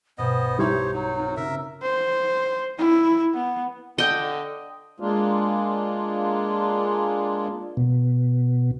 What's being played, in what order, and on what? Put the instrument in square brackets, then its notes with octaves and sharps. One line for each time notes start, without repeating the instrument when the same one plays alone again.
[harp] B1 G2 B2 [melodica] B3 D#5 [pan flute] C5
[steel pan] G3 E4 G4 [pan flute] D#4 [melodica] C5 C#5
[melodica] F#3
[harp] C4 F4 F#4
[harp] C#3 [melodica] A#4 E5
[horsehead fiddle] C5
E4
B3
[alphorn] D3 [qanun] D#5 G5
[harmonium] G#3 A#3 D4 F4
[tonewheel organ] B2